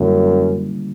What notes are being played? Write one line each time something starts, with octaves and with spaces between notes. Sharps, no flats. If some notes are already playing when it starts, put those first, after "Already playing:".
Already playing: F#2 D3 G3 A#3 C#4 E4